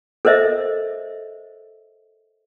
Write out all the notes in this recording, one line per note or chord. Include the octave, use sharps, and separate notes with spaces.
A4 A#4 C5 D#5 E5